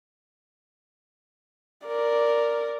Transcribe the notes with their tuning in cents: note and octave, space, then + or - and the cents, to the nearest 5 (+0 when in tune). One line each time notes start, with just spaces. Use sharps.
A#4 +0 D5 -5